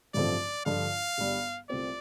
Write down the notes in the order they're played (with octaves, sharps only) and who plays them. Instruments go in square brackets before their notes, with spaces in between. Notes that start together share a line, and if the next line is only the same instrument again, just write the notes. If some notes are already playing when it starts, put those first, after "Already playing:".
[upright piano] A1 G2 F3 A3 C4 [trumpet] D5
[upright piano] G2 D3 F3 D4 F4 [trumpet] F5
[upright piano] G1 G2 G3
[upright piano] C2 C3 A3 C4 F4 [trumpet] D5